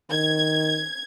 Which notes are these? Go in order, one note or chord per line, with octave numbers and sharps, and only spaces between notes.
D#3 G#6